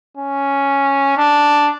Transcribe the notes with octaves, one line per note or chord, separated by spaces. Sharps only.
C#4
D4